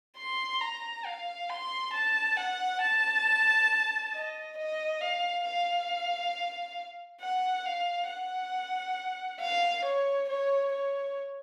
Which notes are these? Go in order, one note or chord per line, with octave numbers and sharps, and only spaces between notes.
C6
A#5
F5
C6
A5
F#5
A5
D#5
D#5
F5
F5
F#5
F5
F#5
F5
C#5
C#5
C#5